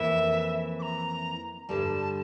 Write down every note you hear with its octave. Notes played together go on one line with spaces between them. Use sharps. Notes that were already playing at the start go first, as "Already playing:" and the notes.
Already playing: F2 E3 A#3 E4 E5
D6
A#5
G2 D3 G3 A5